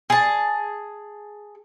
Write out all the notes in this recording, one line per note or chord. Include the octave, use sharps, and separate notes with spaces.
G#4 A5